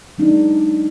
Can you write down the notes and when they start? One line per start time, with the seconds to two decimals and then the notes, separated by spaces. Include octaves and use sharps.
0.18 F#3 G#3 D4 D#4